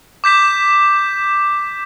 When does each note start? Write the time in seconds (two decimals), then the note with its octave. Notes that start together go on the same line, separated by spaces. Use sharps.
0.24 D6 G6 B6 E7